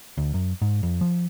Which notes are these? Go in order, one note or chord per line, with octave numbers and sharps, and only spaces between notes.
D2
F#2
G#2
F2
F3